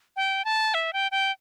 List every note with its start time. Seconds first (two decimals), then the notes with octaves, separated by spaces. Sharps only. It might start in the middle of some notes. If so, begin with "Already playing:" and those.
0.16 G5
0.45 A5
0.74 E5
0.93 G5
1.11 G5